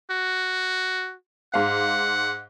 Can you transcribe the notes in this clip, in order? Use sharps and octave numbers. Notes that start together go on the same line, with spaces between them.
F#4
G#2 F5 F#5